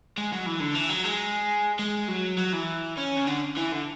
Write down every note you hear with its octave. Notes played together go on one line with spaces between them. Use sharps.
G#3
F#3
E3
D3
E3
F#3
G#3
G#3
F#3
F#3
E3
C#4
C#3
D3
E3
D3